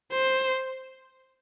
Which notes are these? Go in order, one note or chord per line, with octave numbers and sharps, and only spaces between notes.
C5